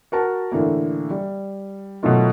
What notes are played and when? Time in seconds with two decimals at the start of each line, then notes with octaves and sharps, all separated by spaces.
0.12 F#4 A#4 A5
0.52 A2 D3 E3 A#3
1.10 G3
2.03 B2 D#3 F#3 A3 D#4 F4